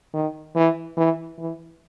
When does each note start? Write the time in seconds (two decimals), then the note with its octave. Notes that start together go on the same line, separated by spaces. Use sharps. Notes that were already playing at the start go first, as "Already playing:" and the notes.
0.14 D#3
0.56 E3
0.97 E3
1.38 E3